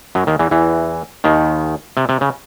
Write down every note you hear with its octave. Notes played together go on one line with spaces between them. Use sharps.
F#2 F#3
D#2 D#3
E2 E3
E2 E3
D#2 D#3
C3
C3
C#3